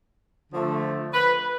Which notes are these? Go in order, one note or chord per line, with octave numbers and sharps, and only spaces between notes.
D3 F3 A3
B4